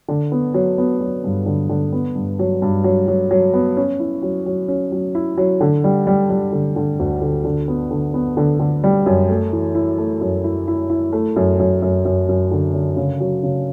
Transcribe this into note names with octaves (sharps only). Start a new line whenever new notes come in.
D3
B3
F#3
B3
F#3
G2
D3
D3
B3
G2
F#3
G2
F#3
F#3
F#3
B3
C#4
E4
F#3
F#3
C#4
F#3
E4
F#3
D3
G3
G3
G3
D3
D3
D2
D3
D3
B3
D3
B3
D3
D3
G3
F#2
A3
E3
E4
A3
F#2
E4
E4
E4
A3
F#2
F#2
F#2
F#2
F#2
D3
D3
C#3
F#3
C#3